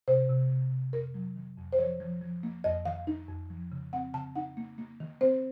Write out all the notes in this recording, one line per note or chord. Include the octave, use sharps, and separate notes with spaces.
C3 C5
C3
C3
C3
F2 A#4
F#3
D#3
F2
C5
F3 C#5
F3
F3
A#3
F2 D#5
D#3 F5
D#4
F2
F3
C#3
C4 F#5
C#3 A5
D#4 F#5
A#3
A#3
D#3
C4 C5